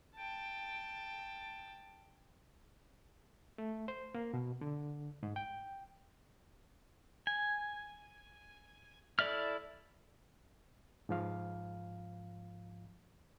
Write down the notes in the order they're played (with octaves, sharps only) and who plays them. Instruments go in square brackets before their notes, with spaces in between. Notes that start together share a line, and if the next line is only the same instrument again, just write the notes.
[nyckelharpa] G5 A5
[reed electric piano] A3
C5
A#3
B2
D3
G#2
G5
[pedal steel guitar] G#5
E4 A4 D5 E5 F6
[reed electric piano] G#2 F3 F5